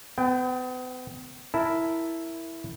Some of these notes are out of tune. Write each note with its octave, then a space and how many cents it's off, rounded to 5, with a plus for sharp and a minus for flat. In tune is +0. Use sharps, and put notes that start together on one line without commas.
B3 +40 G5 +0
E4 +0 A#4 +0 A5 -10